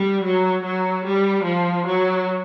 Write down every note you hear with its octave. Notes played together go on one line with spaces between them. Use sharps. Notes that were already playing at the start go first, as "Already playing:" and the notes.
Already playing: G3
F#3
F#3
G3
F3
F#3